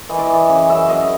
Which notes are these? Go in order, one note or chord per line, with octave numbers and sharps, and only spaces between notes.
E3 D#5
D5
E3 D#5
C#3
F#2 E5
F#2 D#5